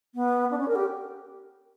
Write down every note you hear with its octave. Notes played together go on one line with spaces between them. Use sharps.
B3
D4
C#4
A#4
G4